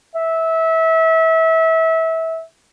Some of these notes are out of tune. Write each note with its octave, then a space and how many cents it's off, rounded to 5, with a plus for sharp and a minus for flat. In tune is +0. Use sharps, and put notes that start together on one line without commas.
E5 -25